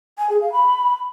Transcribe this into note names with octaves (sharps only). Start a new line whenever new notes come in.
G#5
G#4
F5
B5